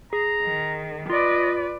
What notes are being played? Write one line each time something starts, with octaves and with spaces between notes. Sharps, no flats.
G#4 A#5
D#3
F4 B4 D5 D#5